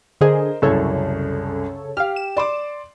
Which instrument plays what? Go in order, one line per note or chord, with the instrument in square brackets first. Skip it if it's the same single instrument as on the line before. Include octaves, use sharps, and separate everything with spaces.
[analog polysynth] D3 G#4 [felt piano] A#4 C5 D#5
[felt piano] C2 F#2 [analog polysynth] C#3 A4 C#5
[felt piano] G4 [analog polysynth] F5 F6
[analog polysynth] E7
[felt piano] D5 C6 D6